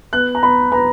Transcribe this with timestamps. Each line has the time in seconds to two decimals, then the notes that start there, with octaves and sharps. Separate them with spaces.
0.13 B3 F#6
0.35 A#5
0.43 B3 B5
0.72 B3 A#5